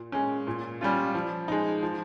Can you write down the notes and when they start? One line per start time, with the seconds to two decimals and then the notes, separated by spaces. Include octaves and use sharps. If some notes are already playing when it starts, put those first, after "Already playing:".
Already playing: A#2
0.12 G#3 C#4
0.47 A#2
0.81 G3 C#4 F4
1.14 F3
1.48 G#3 D#4
1.83 F3